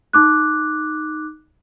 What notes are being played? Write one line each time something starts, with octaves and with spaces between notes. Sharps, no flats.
D#4 D6 F#6